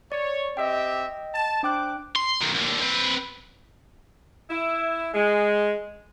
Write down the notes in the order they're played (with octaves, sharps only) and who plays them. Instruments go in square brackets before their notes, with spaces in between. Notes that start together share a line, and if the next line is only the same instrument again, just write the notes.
[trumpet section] C#5 [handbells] D5
[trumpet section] C4 G4 E5 [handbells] D#5 G5
[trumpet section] A5
[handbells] D4 G5 F#6 [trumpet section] C5 D6
[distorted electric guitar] C6
B1 D#3
D#2 D3
C4 B4
[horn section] E4
G#3